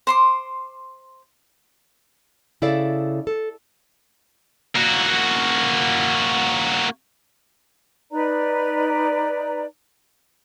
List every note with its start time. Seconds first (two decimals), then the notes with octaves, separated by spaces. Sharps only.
0.07 C5 C6 D6
2.62 C#3 E4 A4 D5 F5
3.27 A4
4.75 A#3 F#4
8.11 D#4 B4 D5 A#5